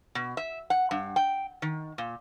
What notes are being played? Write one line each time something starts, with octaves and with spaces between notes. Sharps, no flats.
B2
E5
F#5
G2
G5
D#3
A#2